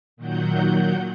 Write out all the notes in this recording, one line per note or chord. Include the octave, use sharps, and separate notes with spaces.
A#2 D#3 F#3 F#5 G6